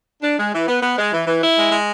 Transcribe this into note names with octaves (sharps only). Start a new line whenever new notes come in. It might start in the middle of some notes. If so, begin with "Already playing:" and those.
D4
G#3
E3
B3
B3
G#3
E3
E3
E4
G#3
G#3